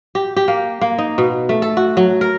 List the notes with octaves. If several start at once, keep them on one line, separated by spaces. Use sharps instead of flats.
G4
G4
A#3
A#3
D#4
B2
A3
A4
F#4
F#3
A#4